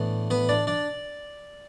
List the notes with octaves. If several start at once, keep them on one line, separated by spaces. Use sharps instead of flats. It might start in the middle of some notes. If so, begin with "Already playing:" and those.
Already playing: A2 E3 B3 D4
B3 B4
D4 D5
D4 D5